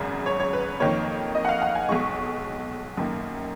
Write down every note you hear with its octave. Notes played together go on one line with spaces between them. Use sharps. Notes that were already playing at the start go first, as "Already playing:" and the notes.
Already playing: G#1 F#2 C#3
C#5
C#5
B4
F2 D#3 A#3 C#5
D#5
F#5
F5
F#5
G#5
B1 B2 G#3 C#6
F#2 D#3 A#3